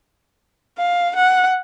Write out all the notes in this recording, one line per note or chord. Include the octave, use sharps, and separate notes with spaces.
F5
F#5